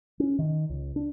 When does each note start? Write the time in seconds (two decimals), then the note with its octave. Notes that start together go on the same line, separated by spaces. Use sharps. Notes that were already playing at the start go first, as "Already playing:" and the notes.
0.20 C#4
0.39 D#3
0.70 C#2
0.96 D4